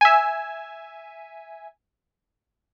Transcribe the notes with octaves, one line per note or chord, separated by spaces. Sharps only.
E5 G#5